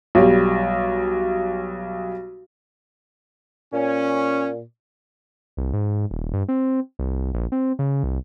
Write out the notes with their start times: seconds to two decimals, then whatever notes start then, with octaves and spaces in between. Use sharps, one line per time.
0.15 B1 G3
3.73 A#2 C#4
5.57 C2
5.73 G#2
6.11 D#1
6.33 G2
6.48 C4
6.99 C2
7.33 A#1
7.52 C4
7.79 C#3
8.03 C2